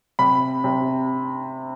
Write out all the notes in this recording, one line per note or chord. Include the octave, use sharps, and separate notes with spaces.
C3 B5
C3